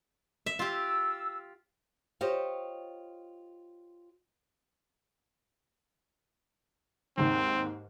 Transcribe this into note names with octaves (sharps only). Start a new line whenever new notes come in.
E5
F4 G4 E6
F4 G4 C5 C#5 D#5
D#2 G#2 D#3 C4